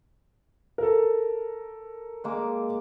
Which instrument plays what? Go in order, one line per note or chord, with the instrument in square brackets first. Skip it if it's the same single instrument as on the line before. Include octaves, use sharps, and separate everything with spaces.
[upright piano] A4 A#4
[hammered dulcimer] G#3 A#3 D6